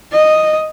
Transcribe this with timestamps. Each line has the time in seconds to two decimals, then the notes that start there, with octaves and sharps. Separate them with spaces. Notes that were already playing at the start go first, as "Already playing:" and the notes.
0.12 D#5